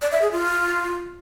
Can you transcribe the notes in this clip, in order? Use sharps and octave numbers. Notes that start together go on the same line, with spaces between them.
D5
E5
G#4
F4